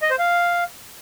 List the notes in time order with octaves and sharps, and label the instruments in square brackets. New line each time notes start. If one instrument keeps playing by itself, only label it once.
[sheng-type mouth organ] D#5
C5
F5